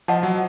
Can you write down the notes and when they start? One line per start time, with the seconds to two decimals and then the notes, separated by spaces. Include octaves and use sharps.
0.08 F3 D#5 F#5 A5
0.23 F#3